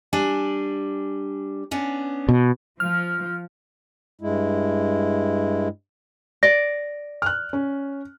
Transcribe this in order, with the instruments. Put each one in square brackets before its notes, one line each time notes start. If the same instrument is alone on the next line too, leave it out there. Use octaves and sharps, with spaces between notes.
[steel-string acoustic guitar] G3 D4 G#5
B3 C#4 D4
[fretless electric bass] B2
[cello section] F3 [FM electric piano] F6
[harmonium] G2 G#3 E4
[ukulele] D5 [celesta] A#6
[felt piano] F6 F#6
C#4